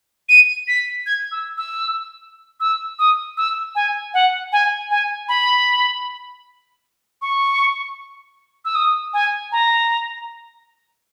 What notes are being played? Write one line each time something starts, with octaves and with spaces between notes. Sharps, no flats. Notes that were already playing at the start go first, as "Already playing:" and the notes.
D#7
B6
G#6
E6
E6
E6
D#6
E6
G#5
F#5
G#5
G#5
B5
C#6
E6
D#6
G#5
A#5